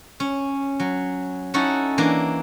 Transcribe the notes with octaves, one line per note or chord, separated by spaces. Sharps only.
C#4
F#3
C#4 D#4 E4 F#4 A4
E3 A#3 D4